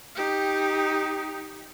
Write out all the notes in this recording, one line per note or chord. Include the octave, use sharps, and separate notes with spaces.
D#4 G4